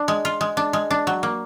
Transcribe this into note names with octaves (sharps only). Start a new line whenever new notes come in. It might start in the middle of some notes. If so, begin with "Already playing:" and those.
Already playing: D4
G#3
F4
G#3
D4
G#3
D4
F#3
A#3